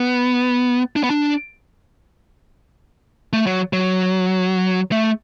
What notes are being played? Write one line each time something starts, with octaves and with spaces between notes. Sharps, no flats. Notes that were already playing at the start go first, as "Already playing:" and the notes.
Already playing: B3
D4
B3
D4
A3
F#3
F#3
A3